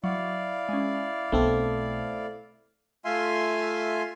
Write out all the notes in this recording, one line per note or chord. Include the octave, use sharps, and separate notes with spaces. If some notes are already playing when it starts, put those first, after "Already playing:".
F#3 E4 D5 F5
G#3 C#4
B1 A3 B3 C4 D4 A4
A3 F4 E5 F5 G#5 C6